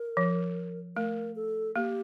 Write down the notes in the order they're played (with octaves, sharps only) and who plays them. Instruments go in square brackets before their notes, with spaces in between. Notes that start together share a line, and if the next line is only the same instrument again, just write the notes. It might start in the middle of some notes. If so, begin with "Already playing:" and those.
Already playing: [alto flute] A#4
[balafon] F3
[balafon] A3 [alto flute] A#4
[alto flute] A4
[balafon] A#3 [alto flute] G4